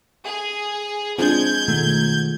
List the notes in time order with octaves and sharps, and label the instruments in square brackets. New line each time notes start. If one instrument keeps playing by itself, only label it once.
[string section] G#4
[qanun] F3 G#3 [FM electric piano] C4 D4 [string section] G6 G#6
[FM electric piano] B2 D#3 A3